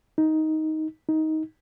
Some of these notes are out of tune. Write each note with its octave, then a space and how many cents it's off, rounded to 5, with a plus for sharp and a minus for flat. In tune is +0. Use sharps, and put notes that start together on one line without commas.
D#4 +10
D#4 +15